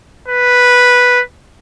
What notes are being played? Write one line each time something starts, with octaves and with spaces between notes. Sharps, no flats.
B4